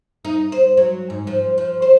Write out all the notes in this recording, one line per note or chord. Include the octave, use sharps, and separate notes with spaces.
D#4
C5
F#3
G#2
F3
F3
C5